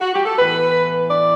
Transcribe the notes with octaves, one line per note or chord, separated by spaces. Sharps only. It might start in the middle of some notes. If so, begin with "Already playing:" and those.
F#4
G4
A4
A2 E3 B3 B4
D5